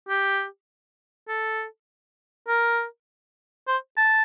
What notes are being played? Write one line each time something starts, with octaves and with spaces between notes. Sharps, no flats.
G4
A4
A#4
C5
A5